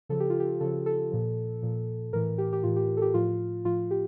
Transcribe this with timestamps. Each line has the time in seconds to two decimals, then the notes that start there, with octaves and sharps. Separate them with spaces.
0.09 C#3 F3 A4
0.20 G4
0.30 F4
0.40 G4
0.61 C#3 F3 A4
0.86 A4
1.11 A#2 F3
1.62 A#2 F3
2.13 A2 E3 A#4
2.38 G4
2.53 G4
2.63 A2 E3 F4
2.76 G4
2.97 A4
3.02 G4
3.14 A2 F3 F4
3.65 A2 F3 F4
3.91 G4